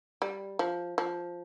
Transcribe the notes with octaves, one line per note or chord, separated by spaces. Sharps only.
G3
F3
F3